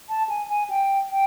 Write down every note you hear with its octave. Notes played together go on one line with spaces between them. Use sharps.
A5
G#5
G#5
G5
G5